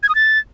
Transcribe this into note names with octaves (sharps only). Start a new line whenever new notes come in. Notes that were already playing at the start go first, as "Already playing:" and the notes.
G#6
D#6
A6